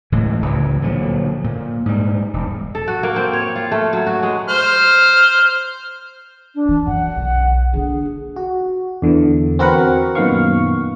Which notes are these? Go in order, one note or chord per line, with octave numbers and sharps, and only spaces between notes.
D1 A2 E3 G#3
C#2 E3
A#2 D3 F3 F#3
A#2
G#2 G3
E1
A4
F#4
A#3
C4
C#5
F4
A3
F#3
F#4
G#3
C5 F6
D4
E3
F#2 F#5
B1
D3 D4 G#4
F#4
E2 D3 E3
C4 F#4 A#4 B4 F#5
F#2 A#2 D#3 B3 F5 C#6